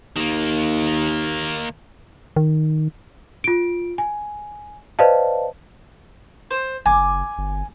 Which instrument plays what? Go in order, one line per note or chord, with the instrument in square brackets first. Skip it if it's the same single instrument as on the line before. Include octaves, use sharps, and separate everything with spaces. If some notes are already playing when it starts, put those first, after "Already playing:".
[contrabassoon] D#2 [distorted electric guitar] D#3 A#3
[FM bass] D#3
[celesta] F4 D7
G#5
B4 C5 D5 D#5 F5 A5
[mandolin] C5
[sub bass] F#1 [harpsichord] G#5 [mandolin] D6
[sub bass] G1